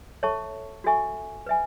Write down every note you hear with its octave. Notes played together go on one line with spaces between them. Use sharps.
A4 C#5 E5 A5 C#6
F#4 A4 E5 G#5 C#6
B4 E5 G#5